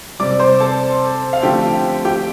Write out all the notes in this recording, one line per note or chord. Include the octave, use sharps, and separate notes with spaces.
C3 G3 C4 D5 D6
C5 C6
A4 A5
F5
D3 F3 A3 C4 G4 G5
G4 G5